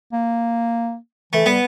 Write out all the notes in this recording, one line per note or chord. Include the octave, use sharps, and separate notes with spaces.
A#3
E3 A3
G3 B3